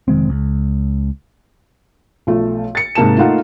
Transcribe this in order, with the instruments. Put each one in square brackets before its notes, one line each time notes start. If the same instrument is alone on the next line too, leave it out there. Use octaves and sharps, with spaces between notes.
[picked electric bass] F1 D#3 G#3 C4
C#2
[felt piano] B1 F3 A3
A6 C#7
G#2 C3 A#3 A5 E7
A3 A#3 D#4 F4 F5 F#5